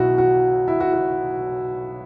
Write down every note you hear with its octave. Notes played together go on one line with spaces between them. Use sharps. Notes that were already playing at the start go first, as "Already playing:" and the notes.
Already playing: B1 B2 F#3 E4 F#4
F#4
E4
F#4
F#4